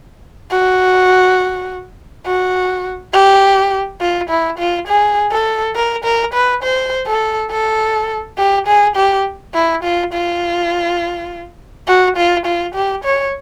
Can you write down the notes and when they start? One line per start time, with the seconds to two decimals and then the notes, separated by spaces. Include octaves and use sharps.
0.51 F#4
2.26 F#4
3.13 G4
4.01 F4
4.30 E4
4.59 F4
4.88 G#4
5.32 A4
5.76 A#4
6.04 A#4
6.34 B4
6.63 C5
7.07 A4
7.51 A4
8.38 G4
8.67 G#4
8.96 G4
9.54 E4
9.83 F4
10.13 F4
11.88 F#4
12.17 F4
12.46 F4
12.75 G4
13.04 C#5